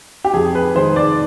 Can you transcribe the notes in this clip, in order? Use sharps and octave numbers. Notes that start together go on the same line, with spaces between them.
G4
F2 G#4
B4
D#3 G#3 C5
D5